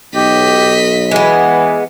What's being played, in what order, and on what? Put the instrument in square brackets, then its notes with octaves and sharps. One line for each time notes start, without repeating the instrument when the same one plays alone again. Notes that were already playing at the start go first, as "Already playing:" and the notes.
[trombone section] B1 [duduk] G4 [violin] D#5 B6
[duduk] E3 [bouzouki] G#3 B3